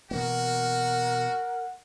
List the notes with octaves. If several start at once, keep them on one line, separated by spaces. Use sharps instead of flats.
B2 E3 A#3 F#4 A#4 F#5